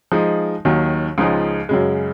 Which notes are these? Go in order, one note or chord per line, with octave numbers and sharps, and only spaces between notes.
F3 G#3 D#4
D#2 D#3 F#3
C#2 C#3 F3 G#3 D#4
F#2 C#3 G#3